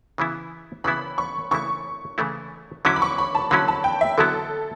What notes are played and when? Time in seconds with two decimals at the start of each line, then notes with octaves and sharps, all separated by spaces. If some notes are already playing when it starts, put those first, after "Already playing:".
0.18 C#3 E3 B3 E4
0.84 C#3 E3 B3 E4 B5
1.18 C#6
1.51 C#3 E3 A3 E4 C#6
2.18 C#3 E3 A3 E4
2.85 D3 F#3 C#4 E4 D6
2.96 B5
3.02 C#6
3.18 B5
3.35 A5
3.51 D3 F#3 C#4 E4 B5
3.68 A5
3.84 G5
4.01 E5
4.18 D3 F#3 B3 E4 A4